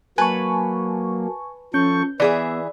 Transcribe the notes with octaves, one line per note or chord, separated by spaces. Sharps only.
F#3 A#3 B4 G#5 A5 C#6
F3 C#4 A4 C#6 G6
E3 B3 G#4 D5 E5